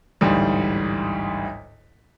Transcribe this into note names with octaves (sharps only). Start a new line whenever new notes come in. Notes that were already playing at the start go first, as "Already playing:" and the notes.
A1 D2 G#2 G3